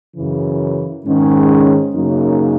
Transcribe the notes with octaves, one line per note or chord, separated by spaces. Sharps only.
F#2 C#3 E3
G#2 D#3 G#3 C#4
F#2 C#3 F#3 A#3 D#4